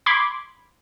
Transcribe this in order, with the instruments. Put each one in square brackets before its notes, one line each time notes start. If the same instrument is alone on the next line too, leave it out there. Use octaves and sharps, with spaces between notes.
[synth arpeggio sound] B5 C6 D6 G#6